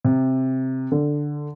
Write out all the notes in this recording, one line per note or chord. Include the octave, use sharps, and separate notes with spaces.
C3
D3